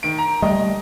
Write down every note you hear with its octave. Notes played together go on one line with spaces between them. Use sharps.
D#3 D7
A#5
G3 A3 D#5